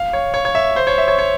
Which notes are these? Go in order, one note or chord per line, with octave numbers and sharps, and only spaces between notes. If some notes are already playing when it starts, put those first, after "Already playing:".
Already playing: F5
C#5
C#5
C#5
E5
C5
C#5
E5
C#5
C#5